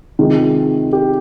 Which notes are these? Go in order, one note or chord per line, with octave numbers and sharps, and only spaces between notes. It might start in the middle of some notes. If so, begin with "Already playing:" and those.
C3 D#3 G#3 F4
G4